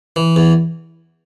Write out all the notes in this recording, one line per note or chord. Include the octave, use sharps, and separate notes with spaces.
E3
E2